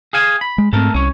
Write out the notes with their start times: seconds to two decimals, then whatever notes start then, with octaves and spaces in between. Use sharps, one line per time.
0.13 G#4 F5 G#5
0.41 B5
0.58 G#3
0.73 G#2 A3 C4 A4 A#4
0.94 C2 C#4 C#5